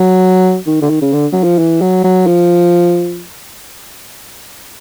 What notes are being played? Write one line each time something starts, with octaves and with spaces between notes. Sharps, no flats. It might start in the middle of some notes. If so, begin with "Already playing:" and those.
Already playing: F#3
D#3
D3
D#3
C#3
D3
F#3
F3
E3
F#3
F#3
F3